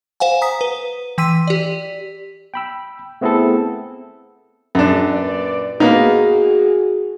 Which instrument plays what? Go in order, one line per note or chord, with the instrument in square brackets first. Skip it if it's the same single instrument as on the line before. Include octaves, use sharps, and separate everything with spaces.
[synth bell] C5 F5 F#5 G#5
A#5 D#6 B6
B4
E3 G5 C6 E6 B6 D#7
G4 D5
[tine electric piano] G5 B5 E6
A3 B3 C4 E4 G#4 A4
[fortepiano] F#2 D4
[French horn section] A#2 B4 D5
[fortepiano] A#3 B3 D#4 [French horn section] F#4 G#4